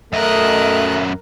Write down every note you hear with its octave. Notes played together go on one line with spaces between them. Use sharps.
F#2 A3 A#4 D#5 E5 F#6